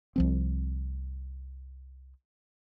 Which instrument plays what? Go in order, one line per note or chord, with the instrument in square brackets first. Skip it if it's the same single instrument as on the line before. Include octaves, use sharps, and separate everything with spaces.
[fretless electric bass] C2 F3 C4